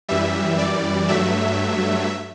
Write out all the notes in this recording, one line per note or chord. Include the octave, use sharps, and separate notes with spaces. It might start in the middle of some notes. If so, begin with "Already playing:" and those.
F#2 E3 G3 E5
D5
G2 F#3 A3 E5